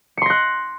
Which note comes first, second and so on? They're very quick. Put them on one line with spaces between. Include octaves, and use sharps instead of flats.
C#7 C6 A#6 F#6